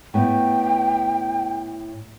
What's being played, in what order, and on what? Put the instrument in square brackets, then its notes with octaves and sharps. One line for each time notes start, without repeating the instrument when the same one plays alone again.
[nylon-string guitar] A2 B3 [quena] G5